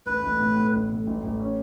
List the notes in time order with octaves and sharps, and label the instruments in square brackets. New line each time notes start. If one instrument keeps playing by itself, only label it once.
[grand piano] A1 [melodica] B4
[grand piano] A1
A2
A2
A1
A2
A1
A1
C#4